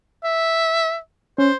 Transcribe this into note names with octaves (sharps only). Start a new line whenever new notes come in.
E5
C#4 C5